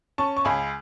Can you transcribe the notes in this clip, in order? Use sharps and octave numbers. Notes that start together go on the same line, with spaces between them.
C#4 A5 C#6
C#6
C#2 G#5 B5